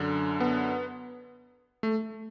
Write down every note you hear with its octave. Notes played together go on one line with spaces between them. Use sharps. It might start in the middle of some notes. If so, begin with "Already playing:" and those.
Already playing: F#2 D3
B3
A3